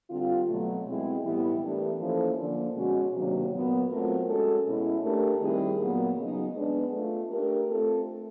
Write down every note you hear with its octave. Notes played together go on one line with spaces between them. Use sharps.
D3 G3 C4 F4
B2 F#3 A3
B2 G#3 C4 E4 G#4
A2 E3 G3 B3 E4
E3 A3 D4 G4 A#4
F3 A#3 C#4 E4 A4
D3 F3 A#3 D4
B2 G#3 C#4 F#4
C3 D#3 F#3 A#3 D4
A#2 F#3 B3
F#3 A3 C4 F4 A#4
G#3 C#4 F#4 A4
B2 G#3 C#4 E4
A3 D4 G4 A#4
D#3 G3 C4 E4 G#4
A#2 F#3 B3
C#3 F#3 B3 D#4
G#3 B3 D4
A3 D4 F4
A3 D4 G4 A#4
A3 C4 F4 A4